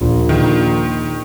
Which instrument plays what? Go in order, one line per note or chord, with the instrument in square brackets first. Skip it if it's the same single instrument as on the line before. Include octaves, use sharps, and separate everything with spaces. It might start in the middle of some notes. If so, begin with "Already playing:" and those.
[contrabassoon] A#1 [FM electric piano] D#2 [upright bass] A#2
[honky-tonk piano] D#3